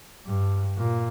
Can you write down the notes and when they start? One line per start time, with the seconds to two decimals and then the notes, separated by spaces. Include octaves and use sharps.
0.27 G2
0.77 A#2